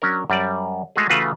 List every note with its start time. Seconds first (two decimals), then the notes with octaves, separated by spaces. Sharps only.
0.02 F#3 C#4 D4 A#4
0.30 F#2 G3 D5
0.96 G#3 A3 F#4 G#4
1.10 C#3 E3 A3 F4 F#4 B4